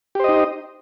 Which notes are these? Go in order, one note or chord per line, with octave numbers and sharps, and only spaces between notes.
D#4 G4 C5 D#5